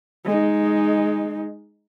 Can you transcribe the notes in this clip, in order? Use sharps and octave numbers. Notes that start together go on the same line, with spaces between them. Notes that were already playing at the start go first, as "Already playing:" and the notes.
G#3 D#4